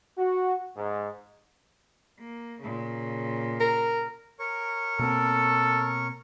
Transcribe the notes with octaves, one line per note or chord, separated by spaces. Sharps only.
F#4
G#2
A#3
A#2 C#3
A#4
A#4 C#5 C#6
B2 A#3 C4 A4